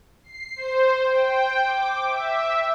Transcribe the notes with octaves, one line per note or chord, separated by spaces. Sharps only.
C7
C5
G5
D6
E5